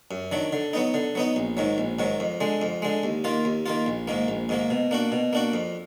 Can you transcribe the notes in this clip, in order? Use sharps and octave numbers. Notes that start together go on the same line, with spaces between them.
F#2
D#3 F#3 D4
D3
F#3 B3 D#4
D3
F#3 B3 D#4
A#1
G#2 D#3 F#3
A#1
G#2 D#3 F#3
F2
D3 G#3
F2
D3 G#3
D#2
D#3 A#3 F4
D#2
D#3 A#3 F4
A#1
G#2 D#3 A#3
A#1
G#2 D#3 A#3
B2
A#3 D4 F#4
B2
A#3 D4 F#4
F2